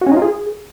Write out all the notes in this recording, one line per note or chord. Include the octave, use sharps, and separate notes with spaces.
F#4
C#4
D#4
F4
G#4